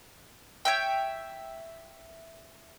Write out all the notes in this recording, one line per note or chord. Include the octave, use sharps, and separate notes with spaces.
C#5 E5 G5